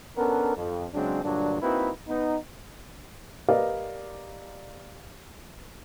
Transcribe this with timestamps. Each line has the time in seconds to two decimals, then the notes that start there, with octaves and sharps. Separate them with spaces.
0.18 B3 C#4 D4 A4 A#4
0.56 F2
0.94 C#3 F#3 G#3 C4 D4
1.23 G2 A#2 D3 F#3 D4
1.62 A#3 C4 D#4 E4 F#4 B4
2.08 B3 D#4
3.48 G4 A#4 B4 D5 D#5 F5